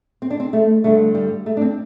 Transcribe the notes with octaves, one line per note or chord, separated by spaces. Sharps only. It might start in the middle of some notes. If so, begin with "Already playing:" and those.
C4
D4
C4
A3
G2 D3 A3
G3
A3
D4
C4